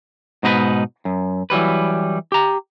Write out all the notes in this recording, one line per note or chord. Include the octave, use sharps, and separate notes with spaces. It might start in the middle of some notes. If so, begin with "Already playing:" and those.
G#2 B2 D#4 F#4 B4
F#2
E3 F#3 G3 B4
G4 A#5